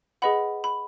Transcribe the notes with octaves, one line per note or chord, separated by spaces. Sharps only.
G#4 B4 D#5 F#5 B5
B5